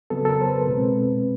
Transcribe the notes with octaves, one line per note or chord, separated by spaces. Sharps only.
C#3 F#3 B3 A4
A4
A#4
C5
B4
B2 G#3 C4